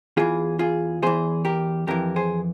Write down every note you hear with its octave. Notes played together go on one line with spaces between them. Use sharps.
E2 E3 F4 G#4
F4 G#4
E2 E3 G#4 C5
G4 A#4
F2 E3 G4 A#4
G#4 C5